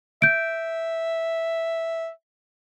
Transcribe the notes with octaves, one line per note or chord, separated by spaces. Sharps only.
E5 G6 D7